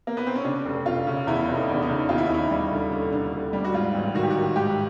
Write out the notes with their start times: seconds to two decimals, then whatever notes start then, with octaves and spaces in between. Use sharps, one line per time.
0.07 A#3
0.17 B3
0.27 C4
0.36 C#4
0.44 C#3 D4
0.65 F1
0.86 F1 F4
1.07 C#3
1.27 E2 E4
1.48 F1
1.55 D#4
1.69 E2
1.74 D4
1.82 D#4
1.89 C#3
2.09 D#2 F4
2.18 E4
2.26 D#4
2.30 D#2 E4
2.51 G3
2.72 D3
2.92 D3
3.12 D3
3.33 D3
3.53 G3
3.64 F#4
3.73 G#2 F4
3.95 A1
4.15 D#3 F#4
4.23 G4
4.30 D#3 F#4
4.56 G#2 G4